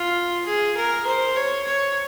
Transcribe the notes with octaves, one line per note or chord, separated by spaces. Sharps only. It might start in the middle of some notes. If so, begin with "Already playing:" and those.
Already playing: F4
G#4
A#4
C5
C#5
C#5